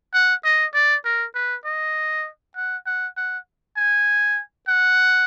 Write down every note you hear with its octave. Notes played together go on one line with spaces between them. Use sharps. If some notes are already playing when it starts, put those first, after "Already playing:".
F#5
D#5
D5
A#4
B4
D#5
F#5
F#5
F#5
G#5
F#5